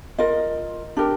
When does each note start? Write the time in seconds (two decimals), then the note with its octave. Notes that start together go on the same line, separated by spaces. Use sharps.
0.18 F4 A#4 D#5
0.97 D4 G4 A#4